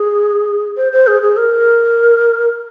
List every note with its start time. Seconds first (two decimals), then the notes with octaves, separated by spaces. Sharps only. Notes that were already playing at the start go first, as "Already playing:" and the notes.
Already playing: G#4
0.77 C5
0.92 C5
1.07 G#4
1.22 G#4
1.37 A#4